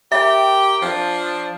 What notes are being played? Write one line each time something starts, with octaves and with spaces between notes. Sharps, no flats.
G4 A#4 E5 G5
F3 D4